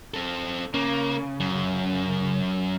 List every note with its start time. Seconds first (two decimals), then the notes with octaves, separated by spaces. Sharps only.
0.14 C4 A4
0.74 C#3 A#3
1.40 F#2